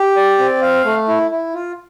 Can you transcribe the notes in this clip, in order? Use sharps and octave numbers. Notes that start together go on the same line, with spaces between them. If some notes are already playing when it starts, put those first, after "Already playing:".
Already playing: G4
D5
C4
F5
A3
E4
E4
F4